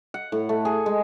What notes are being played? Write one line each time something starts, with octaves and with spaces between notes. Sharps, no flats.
F#5
A2
A3
G#4
G#3